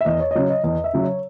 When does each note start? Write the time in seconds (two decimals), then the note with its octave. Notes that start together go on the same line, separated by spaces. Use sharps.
0.01 E5
0.05 E2 D#5
0.20 C#5
0.31 D#5
0.35 C#3 F#3 C#5
0.50 D#5
0.64 E2 D#5
0.84 E5
0.94 C#3 F#3
1.03 C#5